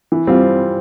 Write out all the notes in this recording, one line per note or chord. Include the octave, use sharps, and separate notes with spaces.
E3
G3 C4 F4